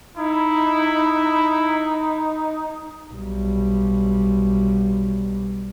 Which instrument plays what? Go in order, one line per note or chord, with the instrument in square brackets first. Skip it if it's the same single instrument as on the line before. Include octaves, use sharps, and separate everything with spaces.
[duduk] D#4 [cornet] E4
[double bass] B1 G3